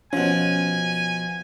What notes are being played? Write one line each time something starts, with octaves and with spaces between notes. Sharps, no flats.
B2 F3 C#4 G#5